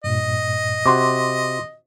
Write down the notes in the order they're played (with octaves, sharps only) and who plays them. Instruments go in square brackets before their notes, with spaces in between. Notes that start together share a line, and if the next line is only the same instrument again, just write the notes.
[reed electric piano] G2 A#2 [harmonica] D#5
[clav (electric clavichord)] C3 F#4 [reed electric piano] C6 D6